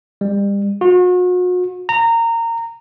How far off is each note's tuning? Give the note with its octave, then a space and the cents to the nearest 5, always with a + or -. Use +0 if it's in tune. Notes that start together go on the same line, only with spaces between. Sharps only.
G3 +35
F#4 -40
A#5 -20